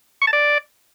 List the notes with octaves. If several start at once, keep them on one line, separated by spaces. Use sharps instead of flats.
C#6
A5
D5